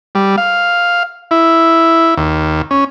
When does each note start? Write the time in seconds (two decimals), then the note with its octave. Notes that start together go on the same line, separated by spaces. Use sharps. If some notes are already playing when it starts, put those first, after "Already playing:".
0.15 G3
0.38 F5
1.31 E4
2.17 D#2
2.71 C#4